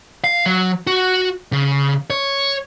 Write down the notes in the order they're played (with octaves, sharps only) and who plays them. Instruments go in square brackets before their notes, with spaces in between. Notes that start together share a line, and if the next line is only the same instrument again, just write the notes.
[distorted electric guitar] F5
F#3
F#4
C#3
C#5